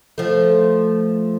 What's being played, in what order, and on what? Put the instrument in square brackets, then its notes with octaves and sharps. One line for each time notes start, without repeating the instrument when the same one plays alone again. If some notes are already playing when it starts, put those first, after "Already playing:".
[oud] F3 A3